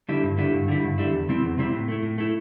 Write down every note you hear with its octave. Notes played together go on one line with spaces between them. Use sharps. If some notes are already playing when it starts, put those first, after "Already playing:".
D3 G3 E4
G2
D3 G3 E4
G2
D3 G3 E4
G2
D3 G3 E4
E2
C3 G3 C4 E4
E2
C3 G3 C4 E4
A2
A3 E4
A2
A3 E4